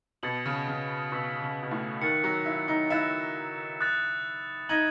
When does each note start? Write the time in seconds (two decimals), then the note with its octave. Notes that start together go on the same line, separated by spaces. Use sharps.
0.23 B2 D#6 A6 C#7 F#7
0.46 C#3
0.68 C#3
1.12 B2 C#6 E6 B6
1.42 C#3
1.63 B2
1.71 A2
2.02 D#3 F#6 A6 C#7
2.24 F#3
2.46 E4
2.68 D#4
2.90 E4 F#6 A6 E7
3.81 D#6 F#6 A6
4.69 D#4 G#6 D#7 F#7